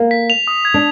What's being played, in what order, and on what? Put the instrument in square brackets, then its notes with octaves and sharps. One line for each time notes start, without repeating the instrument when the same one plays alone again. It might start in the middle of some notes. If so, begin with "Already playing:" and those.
Already playing: [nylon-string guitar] A#3
[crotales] B6
F7
D#6
G#6
[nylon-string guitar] D4